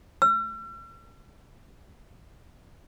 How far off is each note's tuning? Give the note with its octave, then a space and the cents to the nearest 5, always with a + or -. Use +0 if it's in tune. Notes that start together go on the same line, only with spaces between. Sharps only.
E6 +45